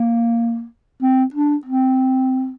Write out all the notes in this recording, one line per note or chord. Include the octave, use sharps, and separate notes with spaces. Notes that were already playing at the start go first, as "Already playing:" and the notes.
Already playing: A#3
C4
D4
C4